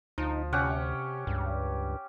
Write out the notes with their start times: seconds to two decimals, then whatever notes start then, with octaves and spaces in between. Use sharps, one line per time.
0.18 D2 F3 D#4
0.53 C3 C#4 G4 F#5
1.27 C#2 G2